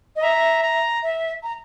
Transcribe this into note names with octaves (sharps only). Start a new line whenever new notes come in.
D#5
E5 A#5
A#5
E5
A#5